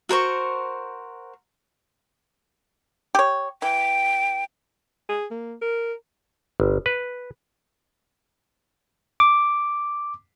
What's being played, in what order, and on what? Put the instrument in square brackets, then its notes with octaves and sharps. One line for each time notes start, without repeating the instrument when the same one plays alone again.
[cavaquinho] F#4 A#4 C5 C#6
[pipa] G4 C#5
[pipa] E3 [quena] G5
[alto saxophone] G#4
A#3
A#4
[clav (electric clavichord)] G1
B4
[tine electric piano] D6